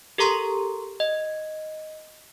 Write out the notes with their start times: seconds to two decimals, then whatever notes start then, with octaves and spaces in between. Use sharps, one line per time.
0.18 G4 A4 A#4 A#5 C6 C#6
1.00 D#5